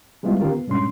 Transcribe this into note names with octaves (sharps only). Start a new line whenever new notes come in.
G3 G#3 B3 E4 F4
D3 D#3 C#4 F4 G4 A#4
B3
G2 A#2 G#3 C#4 D4 C6